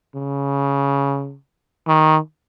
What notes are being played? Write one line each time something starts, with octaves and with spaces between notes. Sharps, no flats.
C#3
D#3